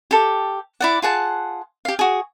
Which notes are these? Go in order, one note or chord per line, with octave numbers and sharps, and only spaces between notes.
G4 A4
E4 D5 F#5
F4 G#4 F#5 A5
G4 F5
F#4 G#4